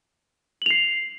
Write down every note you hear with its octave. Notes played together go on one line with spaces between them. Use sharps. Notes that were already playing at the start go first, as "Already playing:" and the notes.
C7 F7 F#7